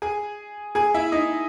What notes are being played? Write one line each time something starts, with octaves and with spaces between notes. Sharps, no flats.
G#4 G#5
G#4 G#5
E4 E5
D#4 D#5